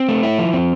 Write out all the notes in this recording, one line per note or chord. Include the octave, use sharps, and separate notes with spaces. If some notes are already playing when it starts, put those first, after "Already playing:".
Already playing: C4
A3
E4
F3
C4